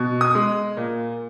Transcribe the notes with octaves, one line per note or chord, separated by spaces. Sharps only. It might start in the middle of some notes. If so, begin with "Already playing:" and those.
Already playing: B2
D#6
G#3
A#2